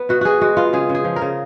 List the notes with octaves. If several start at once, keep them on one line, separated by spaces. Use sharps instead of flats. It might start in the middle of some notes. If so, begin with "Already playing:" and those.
Already playing: B3
B2 F#4
B2 F#4 G#4
G#3 F#4
B3 F4
C#3 G#4
C#3
G#4
F3
A#4
C#3